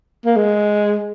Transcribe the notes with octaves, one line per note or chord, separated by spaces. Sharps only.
A#3
G#3